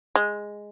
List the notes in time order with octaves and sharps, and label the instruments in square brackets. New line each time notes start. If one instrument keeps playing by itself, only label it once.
[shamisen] G#3